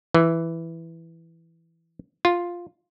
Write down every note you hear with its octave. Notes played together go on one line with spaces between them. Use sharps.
E3
F4